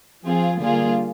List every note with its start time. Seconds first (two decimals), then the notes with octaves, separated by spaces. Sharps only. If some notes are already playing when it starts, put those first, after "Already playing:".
0.24 F3 C4 F4 G#4
0.60 D3 G3 A#3 F4 G#4